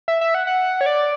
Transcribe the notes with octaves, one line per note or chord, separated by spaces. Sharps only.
E5
E5
F#5
F#5
C#5
D5